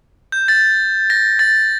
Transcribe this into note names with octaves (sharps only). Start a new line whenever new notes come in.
G6
A6
A#6
A6